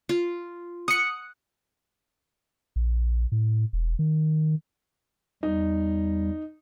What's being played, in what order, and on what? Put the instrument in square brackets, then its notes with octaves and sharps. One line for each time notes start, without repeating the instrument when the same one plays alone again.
[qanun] F4
[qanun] F#5 [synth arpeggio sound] D#6 C#7
[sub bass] A#1
A2
E1
D#3
[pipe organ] E2 G3 [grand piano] D#4